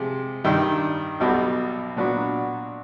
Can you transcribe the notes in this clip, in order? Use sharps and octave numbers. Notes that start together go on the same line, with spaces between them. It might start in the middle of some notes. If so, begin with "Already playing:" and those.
Already playing: C3 F3 G#3
G2 D#3 G3
B1 B2 G3
A#2 F#3 B3 D4 F#4